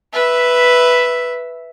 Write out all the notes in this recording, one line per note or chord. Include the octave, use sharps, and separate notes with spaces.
B4 E5